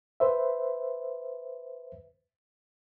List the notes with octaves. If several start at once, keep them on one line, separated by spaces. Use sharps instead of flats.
B4 C5 E5